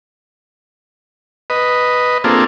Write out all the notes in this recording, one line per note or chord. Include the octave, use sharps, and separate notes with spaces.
B4 D#5
A#3 C4 D4 F4 G#4 A4